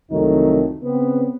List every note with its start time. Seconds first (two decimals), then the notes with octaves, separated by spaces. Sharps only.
0.11 C2 F2 D#3 F#3 A3 D#4
0.83 C#3 B3 C4